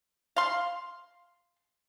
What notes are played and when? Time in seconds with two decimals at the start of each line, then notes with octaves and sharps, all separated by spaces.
0.36 F5 C6